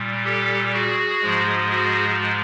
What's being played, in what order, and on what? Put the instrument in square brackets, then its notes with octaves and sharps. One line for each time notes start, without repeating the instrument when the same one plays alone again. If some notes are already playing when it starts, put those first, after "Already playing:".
Already playing: [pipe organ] A#2 G3
G4 A4
F#4 G#4
G#2 F3 G#3
F#4 G#4